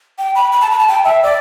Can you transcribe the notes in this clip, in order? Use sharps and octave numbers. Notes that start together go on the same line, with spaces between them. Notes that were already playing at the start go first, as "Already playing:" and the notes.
G5
B5
B5
A5
B5
A5
G5
E5
D5